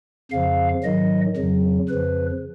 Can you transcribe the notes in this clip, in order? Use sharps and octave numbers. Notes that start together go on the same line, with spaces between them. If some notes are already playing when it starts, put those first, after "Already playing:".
F2 C#3 F3 F5
G#2 D#3 F#3 D#5
F2 C#3 F#3
F2 C#3 F3 B4